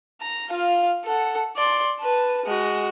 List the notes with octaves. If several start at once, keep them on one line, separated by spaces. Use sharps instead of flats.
A#5
F4 F5
A4 F#5
D5 C6
B4 A5
G#3 F#4